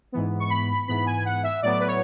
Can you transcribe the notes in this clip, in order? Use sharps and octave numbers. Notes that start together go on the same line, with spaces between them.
G#2 E3 B3
C#6
B5
G#2 E3 B3 B5
G#5
F#5
E5
A2 F#3 B3 D5
B4
C#5